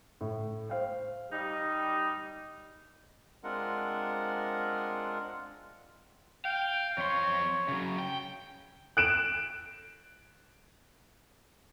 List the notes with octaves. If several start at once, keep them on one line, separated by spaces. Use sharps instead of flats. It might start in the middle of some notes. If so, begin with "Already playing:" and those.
A2
C5 F5 G5
G3 D#4 D#5
G#3 C4 D4 F4 A#4 F#5
F5 G5
F2 C#5 C6
C#3 F#3
G5
F#6 D7 E7